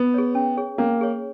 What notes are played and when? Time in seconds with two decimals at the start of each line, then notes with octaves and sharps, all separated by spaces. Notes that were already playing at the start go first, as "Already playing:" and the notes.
Already playing: B3
0.14 G#4 C#5
0.35 C#4
0.57 G#4 C#5
0.78 A#3 C#4
1.01 G#4 C#5